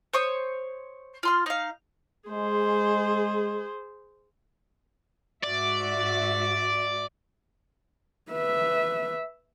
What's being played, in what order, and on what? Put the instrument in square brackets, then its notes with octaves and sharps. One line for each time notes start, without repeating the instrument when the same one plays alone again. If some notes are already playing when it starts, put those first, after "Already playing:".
[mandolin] C5 C#5 C#6 D#6
F4 C6 F6
D#4 F5
[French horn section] G#3 [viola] G#4 C5
[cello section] G#2 F#4 E5 [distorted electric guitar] D5
[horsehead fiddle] B4 E5